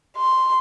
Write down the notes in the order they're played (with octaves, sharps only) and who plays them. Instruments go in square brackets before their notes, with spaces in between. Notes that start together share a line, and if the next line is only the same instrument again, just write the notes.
[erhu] C6